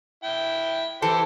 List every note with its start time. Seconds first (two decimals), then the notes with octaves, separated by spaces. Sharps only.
0.24 E4 G5
1.02 E3 G4 A4 C5